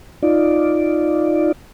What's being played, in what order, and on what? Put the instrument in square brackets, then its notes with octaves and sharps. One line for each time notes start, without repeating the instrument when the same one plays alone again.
[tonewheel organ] D#4 F4 D5